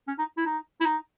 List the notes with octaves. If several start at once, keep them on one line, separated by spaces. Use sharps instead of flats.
C#4
D#4
E4
D#4
E4
D#4